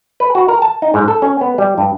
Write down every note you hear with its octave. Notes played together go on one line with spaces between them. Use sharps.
B4
F#4
A#4
A5
D#4
G#2
A4
C#4
B3
G3
G2